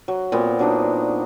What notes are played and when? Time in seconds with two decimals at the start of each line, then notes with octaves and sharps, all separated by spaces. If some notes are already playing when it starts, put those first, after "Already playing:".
0.08 F#3
0.32 A#2 B3 C4
0.59 F#3 D4 D#4